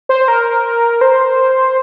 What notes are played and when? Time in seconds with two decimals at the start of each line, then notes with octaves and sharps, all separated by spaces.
0.09 C5
0.28 A#4
1.01 C5